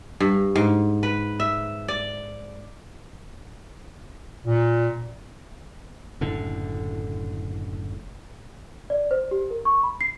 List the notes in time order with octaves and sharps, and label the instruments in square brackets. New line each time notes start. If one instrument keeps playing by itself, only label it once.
[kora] G2
G#2
B4
E5
D5
[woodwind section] A#2
[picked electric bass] F#1 A2 D3
[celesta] D5
C5
G4
A#4
C#6
B5
C7